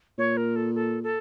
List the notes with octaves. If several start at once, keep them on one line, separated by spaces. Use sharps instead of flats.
A#2 C#5
A#4
A4
A4
A4